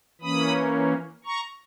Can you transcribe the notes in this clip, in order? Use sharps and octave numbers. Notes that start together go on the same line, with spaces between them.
E3 A#3 C#4 B5 D#6
A#5 C#6